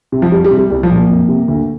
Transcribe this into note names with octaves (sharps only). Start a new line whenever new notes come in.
C3
F3
F2 G3
G3
C3
G3
C2 G3
F3
A#2
A#3
F2
C3
D2